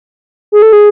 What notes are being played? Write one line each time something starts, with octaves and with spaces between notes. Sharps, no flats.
G#4
A4
G#4